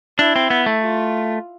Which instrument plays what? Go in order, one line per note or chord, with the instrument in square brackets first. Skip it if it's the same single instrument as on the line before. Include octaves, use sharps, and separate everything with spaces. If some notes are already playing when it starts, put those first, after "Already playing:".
[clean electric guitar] D4 [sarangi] E4
[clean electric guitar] C4
B3
A3
[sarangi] F4